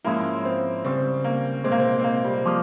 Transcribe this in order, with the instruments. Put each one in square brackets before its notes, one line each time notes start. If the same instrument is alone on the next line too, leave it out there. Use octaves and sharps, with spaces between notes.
[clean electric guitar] G#2 F3 G#3 C#4 E4 [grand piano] A#3
[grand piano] C4
[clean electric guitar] C#2 C#3 G3 [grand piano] C4
[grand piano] A#3
[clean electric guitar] C2 A#2 G#3 [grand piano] C4
[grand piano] A#3
C4
C4
A#3
G3
[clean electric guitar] F3 A#3